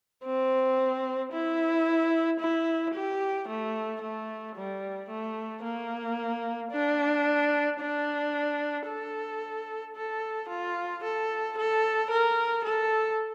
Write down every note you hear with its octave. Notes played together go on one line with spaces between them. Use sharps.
C4
E4
E4
G4
A3
A3
G3
A3
A#3
D4
D4
A4
A4
F4
A4
A4
A#4
A4